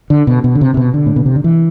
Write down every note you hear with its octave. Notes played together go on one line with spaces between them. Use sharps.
D3
B2
B2
D3
C3
C3
B2
D3
A2
B2
C3
D3
E3